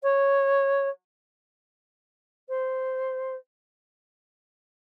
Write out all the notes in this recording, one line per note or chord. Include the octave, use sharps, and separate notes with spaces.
C#5
C5